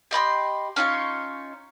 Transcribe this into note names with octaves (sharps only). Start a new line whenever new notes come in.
G4 D#5 B5 C6
C#4 D#4 F4 C#5